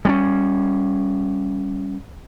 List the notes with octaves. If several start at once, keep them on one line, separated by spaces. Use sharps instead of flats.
G3 B3 C#4